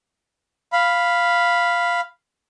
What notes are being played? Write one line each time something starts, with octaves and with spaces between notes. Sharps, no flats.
F5 B5